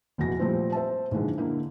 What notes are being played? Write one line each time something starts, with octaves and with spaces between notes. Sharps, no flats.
F1 E2 A#2 F#4 A#6
A#2 F3 G3 A3 C4
C5 E5 A5
A#1 G#2 D3 E3 G#3
D3 A#3 E4